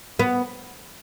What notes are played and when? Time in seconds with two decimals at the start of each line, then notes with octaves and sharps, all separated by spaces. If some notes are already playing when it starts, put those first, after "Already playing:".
0.19 B3